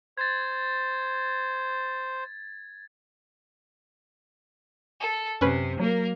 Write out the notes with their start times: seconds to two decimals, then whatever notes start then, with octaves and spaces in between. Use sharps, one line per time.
0.18 C5 G#6 A6
5.00 A4
5.41 F#2 C3 C#4 B4
5.80 F#3 A#3 A#4